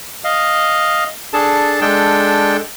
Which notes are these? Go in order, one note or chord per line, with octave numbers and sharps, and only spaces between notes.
D#5 F5
D4 G#4 A4 A5
G#3 D4 A4 G5